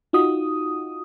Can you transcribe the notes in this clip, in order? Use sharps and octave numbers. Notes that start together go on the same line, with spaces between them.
D#4 F4 F#4 D#6